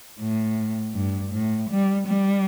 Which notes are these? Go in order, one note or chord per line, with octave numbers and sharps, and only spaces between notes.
A2
G2
A2
G3
G3